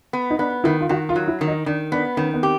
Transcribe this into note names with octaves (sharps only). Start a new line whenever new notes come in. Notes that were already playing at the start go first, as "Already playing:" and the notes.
B3
D#4
B3 D4
D#3 E4
F4
D#3 F#4
F4
F#3
E4
D#3
D#4
D#3 D4
B3 D4
D#3 C#4
B3
C4 G4